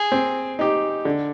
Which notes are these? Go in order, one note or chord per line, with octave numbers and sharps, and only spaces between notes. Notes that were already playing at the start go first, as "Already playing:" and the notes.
Already playing: G#4
C4
D#4 G4
D3